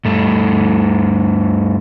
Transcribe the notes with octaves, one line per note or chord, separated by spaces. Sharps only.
G2 A3